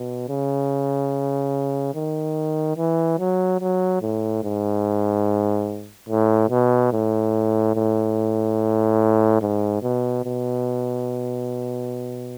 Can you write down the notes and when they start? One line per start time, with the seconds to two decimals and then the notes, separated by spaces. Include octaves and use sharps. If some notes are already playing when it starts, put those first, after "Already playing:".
Already playing: B2
0.29 C#3
1.95 D#3
2.77 E3
3.19 F#3
3.61 F#3
4.02 A2
4.44 G#2
6.09 A2
6.50 B2
6.93 A2
7.76 A2
9.42 G#2
9.82 B2
10.25 B2